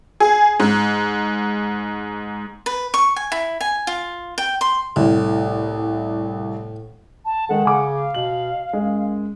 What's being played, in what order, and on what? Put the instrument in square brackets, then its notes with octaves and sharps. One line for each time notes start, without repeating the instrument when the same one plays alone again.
[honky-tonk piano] G#4
G#2
[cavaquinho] B4
C#6
G#5
E4
G#5
F4
G5
C6
[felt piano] C2 [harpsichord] A2
[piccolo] A5
[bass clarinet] D#3 [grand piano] G#3 A4 [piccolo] F#5
[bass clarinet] C#3 [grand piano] G#5 D6
[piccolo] F5
[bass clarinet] B2 [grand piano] F#7
[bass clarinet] F#2 [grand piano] G#3